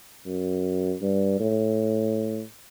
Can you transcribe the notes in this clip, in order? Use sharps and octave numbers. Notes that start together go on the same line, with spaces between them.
F#2
G2
A2